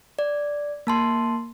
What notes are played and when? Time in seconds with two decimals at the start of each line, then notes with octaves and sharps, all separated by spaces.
0.19 D5
0.87 A#3 A5 C6